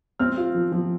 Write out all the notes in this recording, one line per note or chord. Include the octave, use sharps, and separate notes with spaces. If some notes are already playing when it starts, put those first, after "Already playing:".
C4 F6
F4
F3
F3